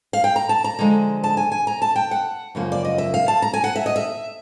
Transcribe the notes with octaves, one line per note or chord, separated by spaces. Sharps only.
F5
G5
A#5
A5
A#5
D3 F3 G#3
A5
G#5
G#5
A#5
A5
G5
F#5
F#2 C#3 F3 A#3
D5
D#5
E5
F5
A5
A#5
G#5
F#5
E5
D#5
E5